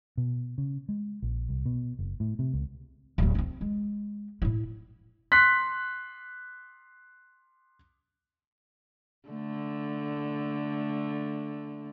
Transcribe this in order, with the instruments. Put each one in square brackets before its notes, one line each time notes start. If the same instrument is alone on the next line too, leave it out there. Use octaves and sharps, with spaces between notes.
[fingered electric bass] B2
C#3
G#3
A#1
C2
B2
F#1
A2
C3
C#2
[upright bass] D1 A#3
B3 C4
G#3
A2 E4
[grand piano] C6 F#6 B6
[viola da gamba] D3 A3